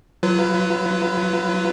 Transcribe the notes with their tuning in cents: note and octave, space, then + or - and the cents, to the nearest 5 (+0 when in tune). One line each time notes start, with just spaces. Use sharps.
F#3 +0 F4 -30 B4 +15